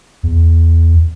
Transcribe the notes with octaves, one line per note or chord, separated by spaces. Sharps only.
E2